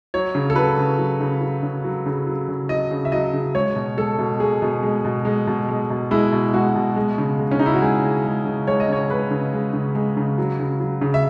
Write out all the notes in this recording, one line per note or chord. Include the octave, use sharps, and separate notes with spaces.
F#3 C#5
C#3
A4
F#3 B4
C#3
F#3
C#3
F#3
C#3
F#3
C#3
F#3
C#3
F#3 D#5
C#3
E5
F#3 D#5
C#3
G#3 C#5
B2
G#3 A4
B2
G#3 G#4
B2
G#3
B2
G#3
B2
G#3
B2
G#3 E4
B2
G#3 F#4
B2
G#3
C#3
G#3
C#4
C#3 D#4
E4
F#4
G#3 G#4
C#3
G#3
C#3
G#3 C#5
D#5
C#3 C#5
G#3 B4
C#3
G#3
C#3
G#3
C#3
F#3
C#3
F#3
C#3
E5